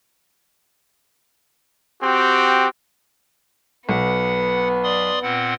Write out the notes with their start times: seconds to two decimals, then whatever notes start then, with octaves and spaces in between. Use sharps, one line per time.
2.01 C4 F#4 G4
3.89 B1 B3 F#5
4.84 D5 C6 D#6
5.22 A#2 C4 F#5